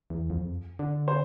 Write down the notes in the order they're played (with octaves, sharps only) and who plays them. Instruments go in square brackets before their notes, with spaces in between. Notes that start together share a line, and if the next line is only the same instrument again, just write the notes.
[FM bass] E2
F2
D3
[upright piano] C5